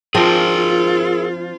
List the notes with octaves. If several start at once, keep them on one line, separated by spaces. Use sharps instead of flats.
F3 C4 D4 F4 G#4 A#4 D#5